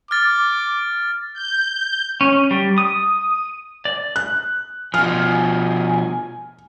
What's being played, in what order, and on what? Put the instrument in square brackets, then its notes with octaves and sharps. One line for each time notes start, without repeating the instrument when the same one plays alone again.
[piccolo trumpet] D6 [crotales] F6 A6
[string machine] G6
[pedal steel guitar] C#4
G3
D#6
D5
[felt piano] F#6
[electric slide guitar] B2 F3 [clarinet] G#5 [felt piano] F6